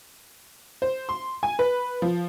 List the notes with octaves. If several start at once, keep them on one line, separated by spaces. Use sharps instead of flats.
C5
C6
G#5
B4
F3